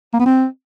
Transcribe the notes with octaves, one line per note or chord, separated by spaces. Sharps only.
A#3
B3
C4